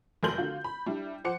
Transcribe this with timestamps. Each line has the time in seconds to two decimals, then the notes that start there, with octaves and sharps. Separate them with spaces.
0.23 F1 F#3 A#4 C6 G6 F#7
0.37 D3 F4 F#4
0.64 B5
0.86 G3 D4 E4
1.24 F3 C5 F#5 D6 C#7